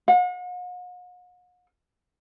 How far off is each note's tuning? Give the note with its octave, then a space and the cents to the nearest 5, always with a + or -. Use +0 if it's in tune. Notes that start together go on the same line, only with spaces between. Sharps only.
F#5 -45